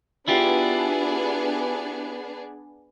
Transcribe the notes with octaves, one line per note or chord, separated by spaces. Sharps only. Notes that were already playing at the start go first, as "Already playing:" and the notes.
B3 D4 E4 F4 G4 G#4